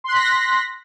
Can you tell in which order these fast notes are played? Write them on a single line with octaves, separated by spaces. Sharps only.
C6 F#6 B6 A#6